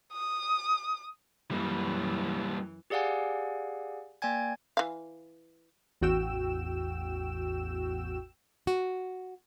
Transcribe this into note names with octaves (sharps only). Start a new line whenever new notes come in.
D#6
F#2 E3 G3 A#3
G4 G#4 D5 F5 F#5 G#5
A#3 D5 G5 G#5 G#6
E3 F5
A1 E2 F#4 G5 E6 E7
F#4